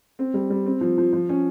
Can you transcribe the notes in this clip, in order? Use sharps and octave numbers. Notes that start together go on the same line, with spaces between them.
C4
G3
G3
C4
F3
F3
F3
C#4